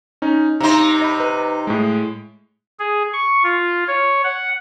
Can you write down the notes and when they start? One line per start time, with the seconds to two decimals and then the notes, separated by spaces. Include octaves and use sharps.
0.22 C#4 D#4
0.60 C3 D#4 A#5 C6
1.02 D#5 B5
1.20 B4
1.67 A2 G#3
2.79 G#4
3.13 C#6
3.43 F4
3.88 C#5
4.23 F#5